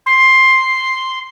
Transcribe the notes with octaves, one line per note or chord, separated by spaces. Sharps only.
C6